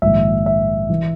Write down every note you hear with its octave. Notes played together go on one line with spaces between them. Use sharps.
A#1 G#2 D#3 E5
E5
E3